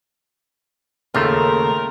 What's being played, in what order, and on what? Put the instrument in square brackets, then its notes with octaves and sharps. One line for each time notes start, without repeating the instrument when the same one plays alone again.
[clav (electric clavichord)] D#2 C#3 A3 [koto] F4 [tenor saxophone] A#4